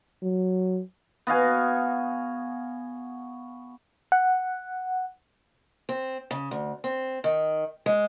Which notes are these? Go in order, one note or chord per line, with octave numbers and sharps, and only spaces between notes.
F#3
B3 F#4 F5 G#5
F#5
C4
C#3
D2
C4
D#3
G#3